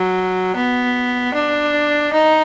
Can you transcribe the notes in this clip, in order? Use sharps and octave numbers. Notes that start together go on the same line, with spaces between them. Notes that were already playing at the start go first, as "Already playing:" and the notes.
Already playing: F#3
B3
D4
D#4